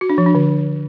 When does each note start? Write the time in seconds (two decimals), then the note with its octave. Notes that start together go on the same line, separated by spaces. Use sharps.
0.01 F#4
0.10 D4
0.18 F3
0.26 D4
0.35 D3